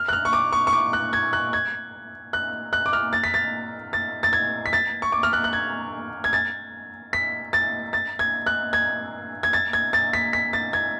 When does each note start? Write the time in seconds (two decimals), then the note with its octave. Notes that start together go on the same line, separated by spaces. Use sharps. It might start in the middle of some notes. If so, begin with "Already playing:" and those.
Already playing: F6
0.08 F#6
0.13 F6
0.25 C#6
0.33 D6
0.53 C#6
0.67 C#6
0.73 D6
0.93 F#6
1.13 G#6
1.33 F#6
1.53 G#6
2.33 F#6
2.73 F#6
2.86 D6
2.93 F6
3.13 A6
3.24 B6
3.34 A6
3.93 A6
4.23 A6
4.33 G#6
4.66 B6
4.73 A6
5.02 C#6
5.12 D6
5.23 F6
5.33 F#6
5.44 F#6
5.53 G#6
6.24 G#6
6.33 A6
7.13 B6
7.53 A6
7.93 A6
8.19 G#6
8.46 F#6
8.73 G#6
9.43 G#6
9.53 A6
9.73 G#6
9.93 A6
10.13 B6
10.33 B6
10.53 A6
10.73 G#6